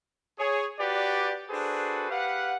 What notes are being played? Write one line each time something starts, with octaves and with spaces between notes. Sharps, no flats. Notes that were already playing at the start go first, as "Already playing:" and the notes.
G#4 C#5
F#4 G4 B4 D5
D4 F#4 G#4 A4 B4 C5
G4 B4 F5 F#5